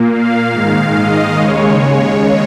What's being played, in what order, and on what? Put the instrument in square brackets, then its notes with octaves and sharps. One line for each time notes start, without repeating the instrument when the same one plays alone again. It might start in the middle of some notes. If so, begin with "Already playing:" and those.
Already playing: [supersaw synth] A#2 A#3
F5
G#2 D#3 G#3 F5
D#5
D#2 C#3 G#3 C#5